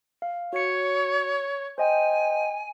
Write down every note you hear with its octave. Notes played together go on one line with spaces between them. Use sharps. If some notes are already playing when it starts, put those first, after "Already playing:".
F5
F#4 C#5 C#7
C5 D#5 G5 G#5